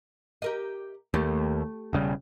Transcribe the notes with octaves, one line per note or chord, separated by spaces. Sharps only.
G4 A#4 D#5
D#2 A3 G4
E1 C#3 G3